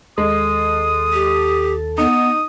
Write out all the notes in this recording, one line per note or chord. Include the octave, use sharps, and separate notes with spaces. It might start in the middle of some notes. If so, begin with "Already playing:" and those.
D#2 G#3 A4 D#6
G4
B3 D#4 D#6